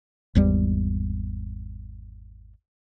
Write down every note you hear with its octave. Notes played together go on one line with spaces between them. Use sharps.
G#1 E2 G3